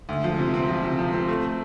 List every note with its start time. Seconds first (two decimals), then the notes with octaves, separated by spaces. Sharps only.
0.09 D2
0.24 F3
0.39 C3
0.54 C4
0.68 F3
0.83 C3
0.99 F3
1.13 C4
1.28 A3
1.43 A3